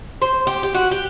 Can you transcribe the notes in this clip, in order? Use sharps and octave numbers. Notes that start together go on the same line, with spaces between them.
C5
G4
G4
F#4
G4